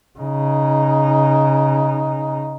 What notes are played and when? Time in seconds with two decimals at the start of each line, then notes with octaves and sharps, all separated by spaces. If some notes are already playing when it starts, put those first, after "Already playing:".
0.19 C#3 D#4